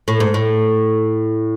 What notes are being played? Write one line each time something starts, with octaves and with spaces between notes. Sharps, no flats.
A2
G#2
A2